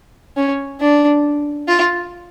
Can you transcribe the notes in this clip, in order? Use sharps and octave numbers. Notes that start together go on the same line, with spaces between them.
C#4
D4
F4